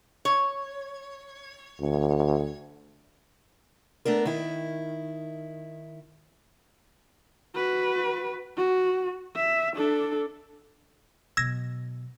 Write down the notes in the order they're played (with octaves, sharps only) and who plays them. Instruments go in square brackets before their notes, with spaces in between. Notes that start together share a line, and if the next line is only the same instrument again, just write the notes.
[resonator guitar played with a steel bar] C#5
[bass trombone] D2
[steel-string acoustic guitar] A3 B3 D4 A#4
D#3 E4
[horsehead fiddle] F#4 B4
F#4
E5
D4 A4
[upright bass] B2 F#3 [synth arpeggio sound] E6 G#6 A#6